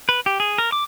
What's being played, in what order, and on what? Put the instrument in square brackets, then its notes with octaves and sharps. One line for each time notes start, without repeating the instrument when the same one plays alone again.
[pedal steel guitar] B4
G4
G#4
A#4
D6